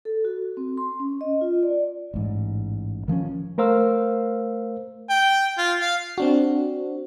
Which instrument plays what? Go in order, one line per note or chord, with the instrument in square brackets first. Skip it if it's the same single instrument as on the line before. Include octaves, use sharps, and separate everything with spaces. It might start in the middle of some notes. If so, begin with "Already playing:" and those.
[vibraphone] A4
F#4
C4
C6
C#4
D#5
F4
D5
[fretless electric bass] A1 G#2
D#3 F3 A#3 C#4
[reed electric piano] A3 A#4 C5 F5 E6
[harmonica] G5
F4
F5
[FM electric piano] C4 D4 F#4